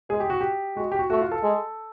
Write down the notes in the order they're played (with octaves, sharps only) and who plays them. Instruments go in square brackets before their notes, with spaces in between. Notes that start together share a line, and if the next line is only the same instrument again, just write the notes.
[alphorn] G#3 [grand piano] G#4
[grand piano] G4
F#4
G4
[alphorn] G#3 [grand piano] F#4
[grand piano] G4
F#4
[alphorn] A3 [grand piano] F#4
[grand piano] F4
A4
[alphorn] G#3